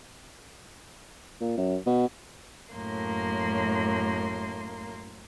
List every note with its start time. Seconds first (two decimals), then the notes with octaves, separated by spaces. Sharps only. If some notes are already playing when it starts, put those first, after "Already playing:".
1.41 A#2
1.57 F#2
1.86 B2
2.73 F#2 A2 A#3 C6